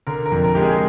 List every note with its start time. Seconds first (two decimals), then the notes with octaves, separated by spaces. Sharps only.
0.07 D3 A#4
0.26 A#4
0.32 F2
0.44 A#4
0.55 G#3 G4
0.62 G#4